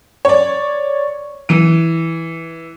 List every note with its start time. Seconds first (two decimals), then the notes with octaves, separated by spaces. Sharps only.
0.25 C#5 D5
1.49 E3 D#7